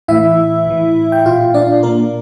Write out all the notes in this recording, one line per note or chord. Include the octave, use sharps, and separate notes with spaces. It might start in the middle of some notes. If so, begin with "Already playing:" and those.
A2 E3 E4 E5
A2 E3
G5
A#2 F4 F5
D4 D5
A#2 A#3 A#4